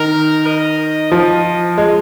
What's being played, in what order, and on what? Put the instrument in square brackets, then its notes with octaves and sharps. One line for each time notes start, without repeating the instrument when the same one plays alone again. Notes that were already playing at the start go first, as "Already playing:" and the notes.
Already playing: [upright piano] D#3 [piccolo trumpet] A#4
[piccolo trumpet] D#5
[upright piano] F3 [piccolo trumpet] D#5
[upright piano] G#3